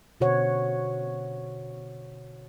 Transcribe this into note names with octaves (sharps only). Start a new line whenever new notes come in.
B2 D3 F#4 C5 C#5 F#5